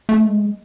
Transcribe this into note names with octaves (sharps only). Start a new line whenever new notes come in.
A3
G#3